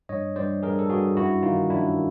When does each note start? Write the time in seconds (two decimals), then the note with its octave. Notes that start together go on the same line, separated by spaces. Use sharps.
0.09 G2 C#5 D#5
0.36 G2 C5 D5
0.63 G2 G#4 A#4
0.79 A4
0.89 G2 F#4 G#4
1.16 F#2 E4 F#4
1.43 D#3 D#4 F4
1.70 F#2 D4 E4